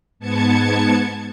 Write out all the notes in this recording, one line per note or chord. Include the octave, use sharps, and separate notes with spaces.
G#2 B3 A5 G#6 C#7